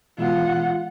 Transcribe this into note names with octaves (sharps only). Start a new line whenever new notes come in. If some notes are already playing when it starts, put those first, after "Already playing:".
B2 E3 G#3 F4 F#5